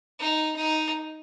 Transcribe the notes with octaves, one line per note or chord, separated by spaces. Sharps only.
D#4
D#4